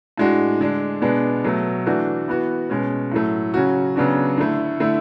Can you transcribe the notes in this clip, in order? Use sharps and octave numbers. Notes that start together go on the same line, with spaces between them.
A2 G#3 D4 F#4
D3 G#3 D4
B2 G#3 B3 D4
B2 F#3 A3
E3 A3 D4 F#4
E3 B3 F#4
B2 G#3 C#4
A2 F#3 A3
C#3 F#3 C#4 F#4
C#3 F#3 B3 D4 F#4
D3 A3 E4
D3 A3 E4